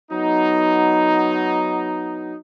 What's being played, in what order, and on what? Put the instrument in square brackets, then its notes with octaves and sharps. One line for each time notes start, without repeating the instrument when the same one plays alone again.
[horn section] F#3 B3 D#4